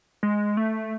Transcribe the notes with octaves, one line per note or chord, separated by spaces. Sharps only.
G#3
A3